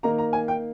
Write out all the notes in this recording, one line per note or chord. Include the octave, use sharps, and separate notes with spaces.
D#3 A#3 D#4 A#5
A#5
G#5
G5